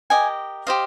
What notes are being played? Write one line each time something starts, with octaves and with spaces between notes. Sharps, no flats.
G4 A#4 D#5 G#5
G4 C5 D#5 F5